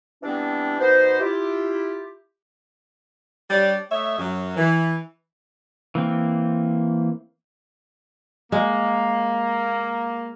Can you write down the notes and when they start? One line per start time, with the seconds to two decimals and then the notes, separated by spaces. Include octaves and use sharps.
0.23 E3 G3 B3 C4 D4
0.80 B2 B3 D#4 C5
1.20 E4 F4 G4
3.50 G3 D4 G4 C#5 D5
3.92 A3 C#5 D#5 E5
4.19 F#2 F#3
4.57 E3
5.95 E3 A#3 C4
8.52 G#3 A#3